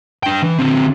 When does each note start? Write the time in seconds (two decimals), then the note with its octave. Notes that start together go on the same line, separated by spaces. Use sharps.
0.23 D4 G5
0.43 E3
0.59 D3 C4